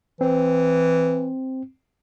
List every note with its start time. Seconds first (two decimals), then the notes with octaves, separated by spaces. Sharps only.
0.21 E3 C4